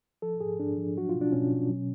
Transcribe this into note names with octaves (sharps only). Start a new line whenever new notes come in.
F3 A4
G#2 G#4
G#2 D4
F3
F#3 F#4
B2 F4
D4
B2 C#4
B2
F#3